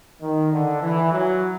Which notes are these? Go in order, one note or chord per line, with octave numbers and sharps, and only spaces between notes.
D#3
D3
E3
F#3